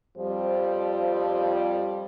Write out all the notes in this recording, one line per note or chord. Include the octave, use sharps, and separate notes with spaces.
F2 F3 G3 C5